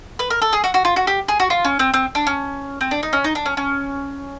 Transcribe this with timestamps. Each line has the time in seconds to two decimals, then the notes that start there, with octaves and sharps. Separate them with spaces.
0.19 B4
0.30 A#4
0.42 A4
0.53 G#4
0.64 F#4
0.74 F#4
0.85 F4
0.96 F#4
1.07 G4
1.28 G#4
1.40 F#4
1.50 F4
1.65 C#4
1.79 C4
1.94 C4
2.15 D4
2.27 C#4
2.81 C4
2.91 D4
3.03 D#4
3.13 C#4
3.24 D#4
3.35 D4
3.46 C#4
3.57 C#4